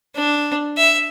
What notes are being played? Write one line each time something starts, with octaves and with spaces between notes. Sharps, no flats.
D4
E5